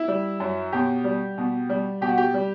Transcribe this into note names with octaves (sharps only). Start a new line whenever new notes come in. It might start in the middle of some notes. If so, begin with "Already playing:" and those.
Already playing: E4
G3
F#2
B2 G4
G3
B2
G3
B2 G4
F#4
G4
G3